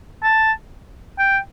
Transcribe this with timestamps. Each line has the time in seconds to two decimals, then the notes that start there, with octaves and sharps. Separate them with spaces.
0.23 A5
1.19 G5